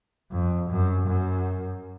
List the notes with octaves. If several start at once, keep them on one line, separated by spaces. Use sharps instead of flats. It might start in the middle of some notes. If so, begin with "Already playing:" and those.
F2
F#2
F#2